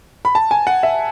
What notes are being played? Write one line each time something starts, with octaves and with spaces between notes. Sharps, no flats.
B5
A5
G#5
F#5
E5